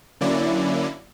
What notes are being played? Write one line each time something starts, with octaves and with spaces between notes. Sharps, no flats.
D3 F#3 A#3 C#4 E4 D5